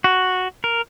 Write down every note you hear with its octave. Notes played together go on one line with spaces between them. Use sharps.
F#4
A#4